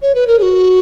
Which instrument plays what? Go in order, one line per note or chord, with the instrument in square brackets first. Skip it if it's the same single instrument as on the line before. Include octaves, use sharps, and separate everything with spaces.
[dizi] C#5
B4
A#4
G#4
F#4